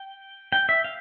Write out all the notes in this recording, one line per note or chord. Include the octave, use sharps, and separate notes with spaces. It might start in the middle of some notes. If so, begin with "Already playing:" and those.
Already playing: G5
G5
E5
F5